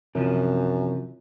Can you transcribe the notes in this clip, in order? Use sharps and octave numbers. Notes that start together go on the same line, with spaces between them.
F#2 C3 E3 F3